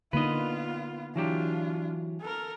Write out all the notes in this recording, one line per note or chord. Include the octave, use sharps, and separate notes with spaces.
D3 A#3 B3 D#4 F4 B4 D#5
E3 F#3 D4 F4 G4
A4 A#4